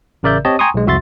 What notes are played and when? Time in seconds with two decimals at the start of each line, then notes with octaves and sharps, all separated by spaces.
0.23 A1 C#3 A#4 D5 E5 G6
0.45 C4 G4 C#5 D#5 A5
0.59 G5 G#5 A#5 C6 C#6 D#6
0.74 B1 G#3
0.86 C2 F2 F#4 E5 C6 A6